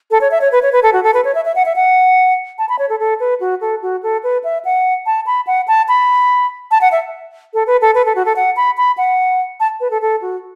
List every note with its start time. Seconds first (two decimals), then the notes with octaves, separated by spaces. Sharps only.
0.11 A4
0.21 C#5
0.31 E5
0.41 C#5
0.52 B4
0.62 C#5
0.72 B4
0.83 A4
0.93 F#4
1.04 A4
1.14 B4
1.25 C#5
1.35 E5
1.45 E5
1.56 F#5
1.66 E5
1.76 F#5
2.58 A5
2.69 B5
2.79 C#5
2.89 A4
3.00 A4
3.20 B4
3.40 F#4
3.61 A4
3.82 F#4
4.03 A4
4.23 B4
4.44 E5
4.65 F#5
5.06 A5
5.27 B5
5.47 F#5
5.68 A5
5.88 B5
6.71 A5
6.81 F#5
6.92 E5
7.54 A4
7.67 B4
7.81 A4
7.95 B4
8.06 A4
8.15 F#4
8.26 A4
8.36 F#5
8.56 B5
8.77 B5
8.98 F#5
9.60 A5
9.80 B4
9.91 A4
10.02 A4
10.22 F#4